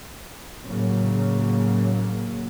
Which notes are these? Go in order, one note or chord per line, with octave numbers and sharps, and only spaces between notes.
A2 C#3 F#3 A#3